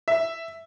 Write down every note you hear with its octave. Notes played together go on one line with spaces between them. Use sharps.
E5